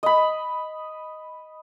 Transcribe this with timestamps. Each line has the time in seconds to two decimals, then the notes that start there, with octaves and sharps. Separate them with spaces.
0.03 D#5 B5